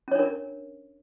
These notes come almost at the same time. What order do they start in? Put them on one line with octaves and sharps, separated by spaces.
C#4 C#5 D4 A#4